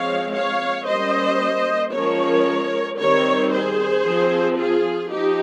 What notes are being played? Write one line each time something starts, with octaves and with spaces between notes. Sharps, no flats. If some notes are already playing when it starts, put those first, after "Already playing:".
Already playing: F3 G#3 C4 C#5 F5
C#5 F5
G3 A#3 C#4 C5 D#5
F3 G#3 C#4 A#4 C#5
D#3 G3 C4 A#4 C#5
G#4 C5
F3 C4
F4 G#4
F3 D#4 G4